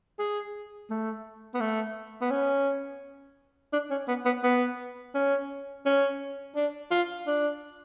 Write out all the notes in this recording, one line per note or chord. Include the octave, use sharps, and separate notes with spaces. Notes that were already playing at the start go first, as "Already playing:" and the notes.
G#4
A3
B3
A3
B3
C#4
D4
C#4
B3
B3
B3
C#4
C#4
D4
F4
D4